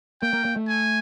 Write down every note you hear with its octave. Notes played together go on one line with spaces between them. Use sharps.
A#3 G5
A#3
A#3
A3
G#5